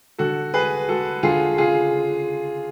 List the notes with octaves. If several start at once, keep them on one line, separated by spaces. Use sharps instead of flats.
D3 F#4 A4
G#3 G#4 B4
G#3 F#4 A4
D3 F4 G#4
C#3 F4 G#4